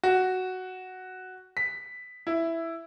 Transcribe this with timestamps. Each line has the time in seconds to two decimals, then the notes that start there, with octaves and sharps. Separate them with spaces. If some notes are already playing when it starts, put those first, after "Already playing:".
0.03 F#4
1.57 B6
2.27 E4